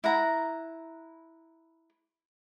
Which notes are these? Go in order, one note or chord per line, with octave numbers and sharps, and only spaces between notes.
E4 F#5 A#5